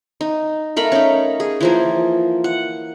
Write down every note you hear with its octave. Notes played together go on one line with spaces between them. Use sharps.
D#4
A3 A#4 F5 B5
C#4 D#4
G#4
E3 F3 A#3
F#5